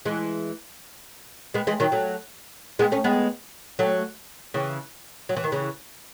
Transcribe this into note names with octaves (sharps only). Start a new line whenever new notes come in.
E3 G#3
G#3 B3
E3 G#3
D#3 F#3
F#3 A3
G#3 B3
A3 C#4
G#3 B3
F#3 A3
C#3 E3
F#3
E3
D#3
C#3 E3